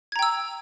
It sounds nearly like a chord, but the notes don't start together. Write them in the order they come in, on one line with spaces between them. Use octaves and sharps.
G#6 A#5 G5 E6